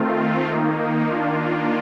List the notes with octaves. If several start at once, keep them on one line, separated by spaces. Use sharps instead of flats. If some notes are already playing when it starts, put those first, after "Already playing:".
Already playing: D#3 A3 C4 F4
D#3 A#3 D#4
D#3 A#3 D4 F4